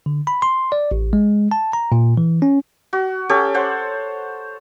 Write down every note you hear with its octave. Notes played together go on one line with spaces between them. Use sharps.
D3
B5
C6
D5
A1
G#3
A5
A#5
A#2
E3
C#4
F#4
C#4 G4 A4 C#5
C5 C#5 F#5